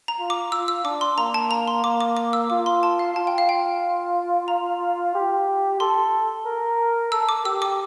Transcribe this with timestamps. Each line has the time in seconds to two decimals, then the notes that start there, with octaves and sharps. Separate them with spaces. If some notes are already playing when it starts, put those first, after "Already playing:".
0.08 A#5
0.19 F4
0.30 D6
0.52 F4 E6
0.68 E6
0.84 D4 D6
1.01 C6
1.17 A#3 A#5
1.34 A5
1.51 A#5
1.68 C6
1.84 A#3 D6
2.01 D6
2.17 D6
2.33 E6
2.50 F4 D6
2.66 C6
2.83 A5
2.99 F5
3.16 F4 A5
3.27 G5
3.38 F5
3.49 G5
4.48 A#5
5.15 G4
5.80 A4 C6
6.46 A#4
7.12 A4 E6
7.29 D6
7.45 G4 E6
7.62 D6